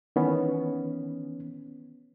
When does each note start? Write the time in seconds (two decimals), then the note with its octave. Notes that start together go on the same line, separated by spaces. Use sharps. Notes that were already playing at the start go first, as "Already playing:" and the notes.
0.16 D#3 E3 B3 C#4